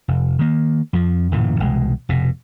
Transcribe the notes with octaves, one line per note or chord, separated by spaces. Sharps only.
F1
D#3 A#3
F2 F3
D1 F#2 A#2 E3
E1 C2 B2 G#3
F1 B2